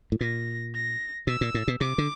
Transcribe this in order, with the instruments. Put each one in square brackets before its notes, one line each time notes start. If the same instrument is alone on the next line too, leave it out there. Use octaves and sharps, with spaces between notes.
[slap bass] A2
[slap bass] A#2 [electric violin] A#6
[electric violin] A#6
[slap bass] B2 [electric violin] E6
[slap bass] A#2
A2
B2
[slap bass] C3 [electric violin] D6
[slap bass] D3